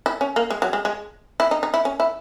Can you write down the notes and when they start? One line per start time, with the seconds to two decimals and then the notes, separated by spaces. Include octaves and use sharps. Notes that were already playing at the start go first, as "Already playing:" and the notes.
0.06 E4
0.21 C#4
0.36 A#3
0.50 G#3
0.62 F#3
0.73 G#3
0.85 G#3
1.40 E4
1.51 D#4
1.63 D#4
1.74 E4
1.85 C#4
2.00 E4